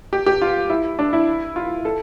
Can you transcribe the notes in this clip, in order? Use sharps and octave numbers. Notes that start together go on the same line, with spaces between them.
G4
G4
F4
E4
D4
E4
F4
A4